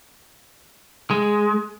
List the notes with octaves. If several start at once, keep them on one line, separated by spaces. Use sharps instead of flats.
G#3